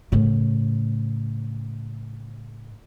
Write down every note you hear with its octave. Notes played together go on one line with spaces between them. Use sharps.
A2 C#3